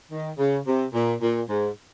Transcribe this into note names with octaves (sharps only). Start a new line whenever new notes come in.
D#3
C#3
C3
A#2
A#2
G#2